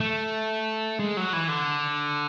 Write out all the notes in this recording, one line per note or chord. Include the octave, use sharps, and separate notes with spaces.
A3
G#3
F#3
E3
D3